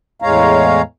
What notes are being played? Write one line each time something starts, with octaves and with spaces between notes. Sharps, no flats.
E2 A2 G#3 C#5 F5 A#5